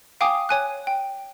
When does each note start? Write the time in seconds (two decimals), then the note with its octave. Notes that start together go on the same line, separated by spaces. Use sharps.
0.21 F5 G5 G#5 D6 D#6
0.49 C#5 G#5 F#6
0.87 G5